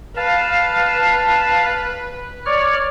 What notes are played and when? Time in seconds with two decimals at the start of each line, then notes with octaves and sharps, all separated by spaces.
0.16 B4 F5 A5
2.46 C#5 D5 F6